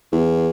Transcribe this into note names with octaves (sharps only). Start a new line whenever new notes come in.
E2